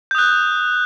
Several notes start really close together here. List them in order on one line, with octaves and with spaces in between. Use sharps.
G6 D#6 F#6